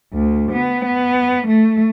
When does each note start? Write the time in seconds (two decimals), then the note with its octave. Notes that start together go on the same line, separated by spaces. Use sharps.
0.13 D2
0.52 B3
0.86 B3
1.48 A3